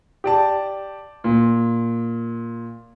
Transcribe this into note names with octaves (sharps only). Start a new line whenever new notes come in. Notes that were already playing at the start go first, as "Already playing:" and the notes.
G4 D5 A5
A#2